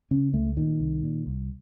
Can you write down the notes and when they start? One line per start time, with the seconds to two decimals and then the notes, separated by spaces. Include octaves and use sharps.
0.11 C#3 C#4
0.33 C#2 A3
0.57 A#2 D#3
0.80 C2
1.03 A#2
1.26 C2